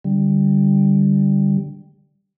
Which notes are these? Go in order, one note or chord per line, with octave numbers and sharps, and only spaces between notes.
D3 G3